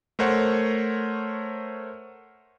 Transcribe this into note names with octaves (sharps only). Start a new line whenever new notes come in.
A3 A#4 C5 C#5 F#5